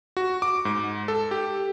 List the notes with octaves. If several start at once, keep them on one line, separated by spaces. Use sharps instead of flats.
F#4
D6
G#2
A4
G4